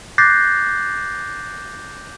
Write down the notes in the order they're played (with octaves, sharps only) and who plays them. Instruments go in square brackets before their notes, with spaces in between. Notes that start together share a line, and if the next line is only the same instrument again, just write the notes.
[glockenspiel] D6 F#6 G6 A6 A#6 C7